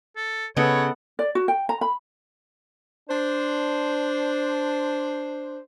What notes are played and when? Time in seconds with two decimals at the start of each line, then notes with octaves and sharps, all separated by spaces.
0.17 A4
0.57 C#3 B3 A4 C#5 D#5 F#5
1.19 D5
1.35 F#4
1.48 G5
1.69 A#5
1.81 B5
3.10 D4 C5